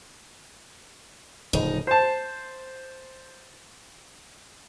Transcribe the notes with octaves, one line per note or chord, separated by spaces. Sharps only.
D1 C#3 F3 D#4
C5 A5